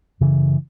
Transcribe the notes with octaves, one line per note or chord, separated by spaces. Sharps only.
F#2 C#3 E3